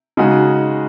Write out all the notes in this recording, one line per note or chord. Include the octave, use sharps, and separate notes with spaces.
C#3 G#3 D#4 F#4